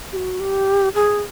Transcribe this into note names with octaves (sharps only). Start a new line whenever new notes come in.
G4
F#4
G4
G#4